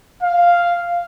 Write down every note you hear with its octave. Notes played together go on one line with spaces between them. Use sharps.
F5